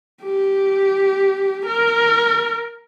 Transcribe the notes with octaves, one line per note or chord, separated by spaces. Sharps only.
G4
A#4